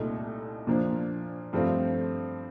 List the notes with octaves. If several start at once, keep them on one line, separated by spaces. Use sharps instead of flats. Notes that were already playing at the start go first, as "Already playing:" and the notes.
Already playing: C2 A#2 A3 D#4 A4
A#2 F3 A#3 D4
G2 F3 A3 C4 F4